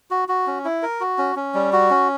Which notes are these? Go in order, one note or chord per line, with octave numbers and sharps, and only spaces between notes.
F#4
F#4
C#4
E4
A#4
F#4
C#4
C#4
G3
F#4
C#4